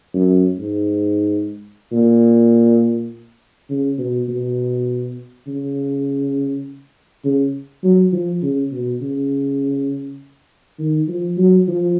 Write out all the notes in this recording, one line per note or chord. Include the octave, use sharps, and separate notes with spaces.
F#2
G#2
A#2
C#3
B2
B2
C#3
C#3
F#3
F3
C#3
B2
C#3
D#3
F3
F#3
F3